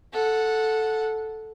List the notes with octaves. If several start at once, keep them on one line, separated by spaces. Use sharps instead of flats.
A4 F#5